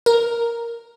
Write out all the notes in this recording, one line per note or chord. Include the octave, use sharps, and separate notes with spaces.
A#4